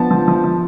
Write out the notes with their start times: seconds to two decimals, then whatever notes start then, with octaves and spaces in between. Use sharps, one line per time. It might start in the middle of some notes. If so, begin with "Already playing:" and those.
Already playing: F3 B3 D4 A5
0.11 F3
0.28 F3
0.44 F3